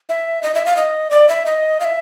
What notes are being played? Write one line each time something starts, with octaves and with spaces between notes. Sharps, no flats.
E5
D#5
E5
F5
D#5
D5
E5
D#5
F5
E5